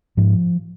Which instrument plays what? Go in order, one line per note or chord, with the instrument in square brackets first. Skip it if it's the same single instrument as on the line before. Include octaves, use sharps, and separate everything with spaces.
[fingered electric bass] G#2 F3